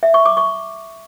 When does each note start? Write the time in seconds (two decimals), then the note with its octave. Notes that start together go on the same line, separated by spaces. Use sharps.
0.03 E5
0.14 C#6
0.26 D6
0.37 C#6